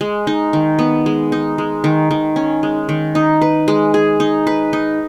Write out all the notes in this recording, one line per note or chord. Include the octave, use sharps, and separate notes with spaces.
G#3
D#4
D#3
B3
G#3
D#4
G#3
D#3
D#3
C#4
G#3
D#3
D#4
B4
G#3
G#4
D#4
B4
D#4